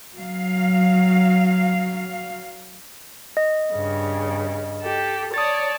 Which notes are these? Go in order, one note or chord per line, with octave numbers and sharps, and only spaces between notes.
F#3 F5
D#5
G2 C#3
G4 A4
C#5 D5 A5 D#6 A6